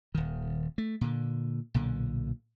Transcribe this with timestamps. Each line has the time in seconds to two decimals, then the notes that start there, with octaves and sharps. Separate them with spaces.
0.15 D#1 D#3
0.78 A3
1.01 A#2 D3
1.74 B1 A#2 D3